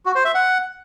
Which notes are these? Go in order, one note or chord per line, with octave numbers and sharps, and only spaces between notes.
F#4
C5
E5
F#5